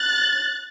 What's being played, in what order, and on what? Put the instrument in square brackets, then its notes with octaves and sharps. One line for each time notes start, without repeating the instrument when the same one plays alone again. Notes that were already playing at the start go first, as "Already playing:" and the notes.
Already playing: [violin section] F#6 A6